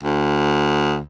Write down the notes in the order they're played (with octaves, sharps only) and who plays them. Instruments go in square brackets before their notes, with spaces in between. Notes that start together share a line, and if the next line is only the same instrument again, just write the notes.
[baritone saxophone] D2